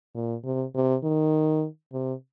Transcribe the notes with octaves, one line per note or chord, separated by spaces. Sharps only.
A#2
C3
C3
D#3
C3